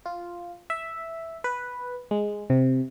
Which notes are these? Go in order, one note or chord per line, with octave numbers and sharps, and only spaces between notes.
F4
E5
B4
G#3
C3